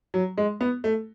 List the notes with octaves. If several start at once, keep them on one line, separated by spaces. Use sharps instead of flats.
F#3
G#3
B3
A3